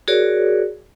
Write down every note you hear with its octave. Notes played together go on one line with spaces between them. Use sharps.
F#4 G#4 A#4 C#5 D5